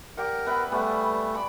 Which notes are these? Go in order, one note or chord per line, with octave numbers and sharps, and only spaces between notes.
G4 A#4 D5 F#5
B3 B4 E5
G3 A3 B3 G#4
D5 B5 C#6